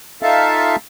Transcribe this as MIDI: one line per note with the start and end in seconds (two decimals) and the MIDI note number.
0.22 0.76 63
0.22 0.76 65
0.22 0.76 69
0.22 0.76 76
0.22 0.76 77
0.22 0.76 81